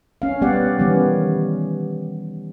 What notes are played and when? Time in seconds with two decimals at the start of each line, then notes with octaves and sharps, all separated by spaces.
0.22 C#4 F5
0.41 G3 B3 G4 D5 F5 F#5
0.79 D#3 E3 G3 B3 C#4